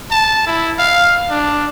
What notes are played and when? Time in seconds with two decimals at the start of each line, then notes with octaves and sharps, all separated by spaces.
0.11 A5
0.47 E4
0.79 F5
1.30 D4